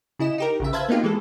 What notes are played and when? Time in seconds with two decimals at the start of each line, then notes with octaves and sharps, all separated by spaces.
0.19 C#3 E4 D#5 E7
0.38 D#4 G4 A#4
0.60 A#1 C#3 E5
0.73 B4 C5 E5 F5 A5 G#6
0.88 A#3 B3 D#4 F4 G4
1.03 E3 G#3 A4